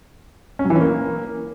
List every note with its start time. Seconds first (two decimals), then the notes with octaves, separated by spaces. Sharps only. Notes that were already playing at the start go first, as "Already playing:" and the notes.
0.59 C#4
0.65 F#3
0.70 E3
0.76 C#4
0.81 A#3